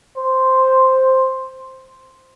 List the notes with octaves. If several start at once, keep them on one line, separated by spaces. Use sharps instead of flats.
C5